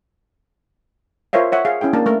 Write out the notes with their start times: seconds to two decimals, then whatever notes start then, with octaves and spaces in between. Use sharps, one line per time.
1.33 F4 A#4 C5 C#5 E5 F5
1.52 C#5 E5 F#5
1.65 G#4 F5
1.81 C#4 E4 G#4 G5
1.93 A#3 D4 A5
2.06 A3 A#4